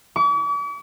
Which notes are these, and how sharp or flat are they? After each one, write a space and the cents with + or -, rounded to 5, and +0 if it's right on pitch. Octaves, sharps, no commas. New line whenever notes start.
D6 -45